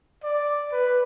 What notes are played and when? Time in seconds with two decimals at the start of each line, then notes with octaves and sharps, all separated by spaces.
0.23 D5
0.72 B4